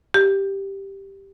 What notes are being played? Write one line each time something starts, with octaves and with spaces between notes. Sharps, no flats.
G4